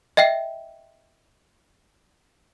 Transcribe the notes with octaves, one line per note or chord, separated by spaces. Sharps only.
D#5 E5 G5 C7